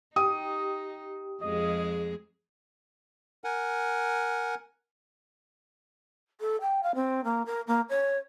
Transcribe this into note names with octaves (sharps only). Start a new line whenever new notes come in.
D#4 G4 D#6
F2 G#3 G#4 D#5
A#4 F#5 G#5
A4
G5
F5
C4
A#3
A#4
A#3
C#5